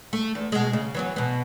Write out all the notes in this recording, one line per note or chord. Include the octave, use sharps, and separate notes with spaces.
A3
E2
B2 G#3
C#3
E3 F#3 B3
B2 B3